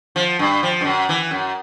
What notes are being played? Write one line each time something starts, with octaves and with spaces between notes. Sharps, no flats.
F3
G2
F3
G2
F#2
E3
F#2